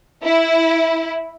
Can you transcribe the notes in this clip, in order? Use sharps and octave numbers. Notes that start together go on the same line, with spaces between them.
E4